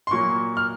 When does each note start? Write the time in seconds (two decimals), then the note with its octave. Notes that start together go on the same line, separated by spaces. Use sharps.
0.07 C6
0.11 A#2 F#3 A#3 C#6
0.57 F6